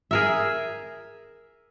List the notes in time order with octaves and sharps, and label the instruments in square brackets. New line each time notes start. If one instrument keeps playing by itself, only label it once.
[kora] G#4 A#4 E5